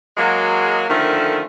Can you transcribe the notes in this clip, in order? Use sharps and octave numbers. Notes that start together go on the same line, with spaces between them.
F#3 G#3 A#3
D3 D#3 F3 A3 A#3 C#4